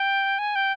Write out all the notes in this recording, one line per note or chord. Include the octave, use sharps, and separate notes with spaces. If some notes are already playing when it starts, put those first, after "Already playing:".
Already playing: G5
G#5
G5